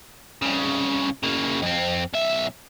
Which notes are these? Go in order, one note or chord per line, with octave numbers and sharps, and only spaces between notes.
C2 C#3
C#3 A#3
F2 C4
B1 E5